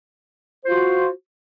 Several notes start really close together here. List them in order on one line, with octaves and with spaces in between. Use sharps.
C5 F4 F#4